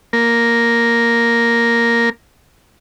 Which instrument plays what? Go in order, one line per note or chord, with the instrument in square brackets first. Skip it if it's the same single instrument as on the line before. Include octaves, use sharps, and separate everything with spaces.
[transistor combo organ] A#3 A#4